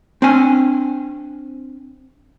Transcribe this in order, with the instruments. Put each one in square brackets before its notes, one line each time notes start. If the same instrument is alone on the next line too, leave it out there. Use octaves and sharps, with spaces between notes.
[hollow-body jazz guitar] C4 D4 G#5